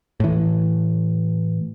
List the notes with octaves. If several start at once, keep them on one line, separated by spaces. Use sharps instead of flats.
A2 E3